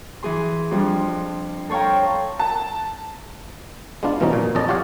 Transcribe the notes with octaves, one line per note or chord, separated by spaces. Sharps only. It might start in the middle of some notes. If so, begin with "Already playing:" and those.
E3 G#4 C6
F2 G3 D4
A4 C5 C#5 F5 G5 A#5
A5
G#3 B3 D4 F4
G2 B2 E3 F3 C#4 D#4
A#2
F2 C#4 D5 D#5 A5
F4 G4 C#5 D5 F5 F#5